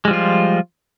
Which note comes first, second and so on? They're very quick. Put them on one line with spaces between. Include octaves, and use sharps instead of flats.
G#3 G3 F3 F4